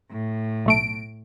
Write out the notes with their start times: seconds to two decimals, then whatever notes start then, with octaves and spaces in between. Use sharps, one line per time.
0.11 A2
0.66 B1 A3 D7